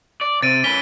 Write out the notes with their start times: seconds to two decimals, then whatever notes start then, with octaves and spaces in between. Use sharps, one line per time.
0.21 D5
0.42 C3 A6 D7 D#7
0.64 C#4 B4 B6 G7